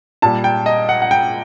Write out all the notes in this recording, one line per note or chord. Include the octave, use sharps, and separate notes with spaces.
A#2 G3 A5
G5
D#5
F#5
F#5
G5